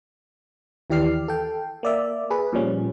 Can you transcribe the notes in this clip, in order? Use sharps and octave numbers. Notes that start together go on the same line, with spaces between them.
D#2 E3 G4 D5 F6 C7
A4 G5
A#3 D5 E5
G#4 B4
A#2 F3 G3 C#4